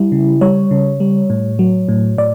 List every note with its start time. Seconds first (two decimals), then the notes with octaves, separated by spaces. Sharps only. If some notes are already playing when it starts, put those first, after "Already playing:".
Already playing: G3 E4
0.12 C#3
0.41 G3 C#5
0.71 C#3
1.00 G3
1.30 A2
1.59 F#3
1.89 A2
2.18 A2 D5